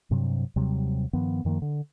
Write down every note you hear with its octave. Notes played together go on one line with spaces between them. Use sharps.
G2 C3 F#3
D#2 C3 F#3 G3
G2 D#3 F3 B3
F#2 D#3 F3 A#3
D3